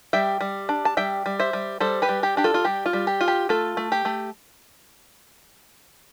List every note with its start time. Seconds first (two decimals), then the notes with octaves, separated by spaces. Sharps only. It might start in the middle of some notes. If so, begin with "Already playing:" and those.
0.13 G3 E5 G5
0.41 G3
0.69 D4
0.85 A5
0.97 G3 E5 G5
1.26 G3
1.40 C5 E5
1.53 G3
1.80 G3 A4 C5
2.02 G4 B4
2.09 G3
2.23 G4
2.37 D4 G4
2.44 F4 A4
2.54 F4
2.65 G3 G4
2.86 F4
2.93 G3
3.07 G4
3.21 F4
3.28 G4
3.49 A3 F4 A4
3.77 A3
3.92 G4
4.05 A3